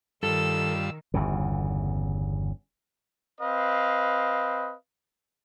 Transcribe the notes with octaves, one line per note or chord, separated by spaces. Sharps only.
G2 D#3 G3 F4 A4 E6
G1 E2 C#3
C4 B4 D#5 F5